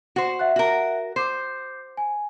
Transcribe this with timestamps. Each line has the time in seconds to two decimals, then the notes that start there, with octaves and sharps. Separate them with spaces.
0.16 F#4 C5
0.39 E5 F#5 F#6
0.56 F#4 A#4
1.16 C5 D6 G6 C7
1.97 G#5